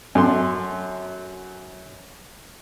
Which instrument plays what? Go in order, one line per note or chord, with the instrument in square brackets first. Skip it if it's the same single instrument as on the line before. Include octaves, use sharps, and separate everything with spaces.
[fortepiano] F#2 A3 C6